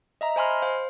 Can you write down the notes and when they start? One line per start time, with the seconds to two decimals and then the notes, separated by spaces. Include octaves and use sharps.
0.21 D#5 E5 A#5
0.36 C5 D#5 G#5 B5 C6 F6
0.62 C5 F5